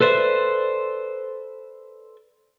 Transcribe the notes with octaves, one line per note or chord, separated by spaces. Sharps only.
A4 B4 C5 D5 E5